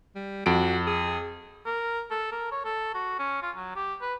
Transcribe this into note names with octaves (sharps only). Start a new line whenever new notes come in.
G3
F2 F#4 D7
G#4
A#4
A4
A#4
C#5
A4
F#4
C#4
F4
F#3
G4
B4